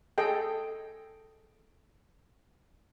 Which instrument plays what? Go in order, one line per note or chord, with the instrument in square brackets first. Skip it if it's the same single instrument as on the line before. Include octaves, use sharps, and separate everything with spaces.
[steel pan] G#4 A4 D#5 G5